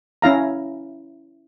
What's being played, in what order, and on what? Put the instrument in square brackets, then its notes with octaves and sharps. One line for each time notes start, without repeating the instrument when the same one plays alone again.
[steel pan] C#4 E4 F5 A#5